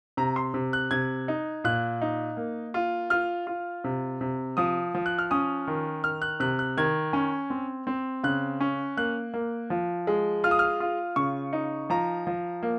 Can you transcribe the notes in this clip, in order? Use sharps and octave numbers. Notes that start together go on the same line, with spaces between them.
C3 A#5
C6
C3
F#6
C3 G#6
D#4
A#2 F#6
D#4
A#3
F4
F4 F6
F4
C3
C3
F3 D#6
F3
F#6
F6
C#4 D#6
D#3
D#3 F6
F#6
C3 F#6
F#6
D#3 G#6
C#4
C4
C4
C#3 F#6
C#4
A#3 F#6
A#3
F3
G#3
F4 F6
D#6
F6
F4
C#3 C#6
D#4
F3 A#5
F3
A#3